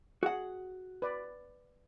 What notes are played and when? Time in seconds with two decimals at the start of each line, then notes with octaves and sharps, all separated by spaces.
0.23 F#4 G#4 F#5
1.02 B4 D5